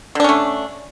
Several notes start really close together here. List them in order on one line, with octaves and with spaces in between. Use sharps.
D3 D4 C#4 A3